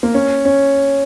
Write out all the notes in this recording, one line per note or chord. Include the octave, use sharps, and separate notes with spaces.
A#3
C#4
C#4